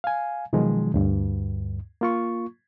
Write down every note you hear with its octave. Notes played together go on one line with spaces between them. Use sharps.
F5 G#5
B2 D#3 F3 F#3 G#3
D2 G2
A#3 F4 C#6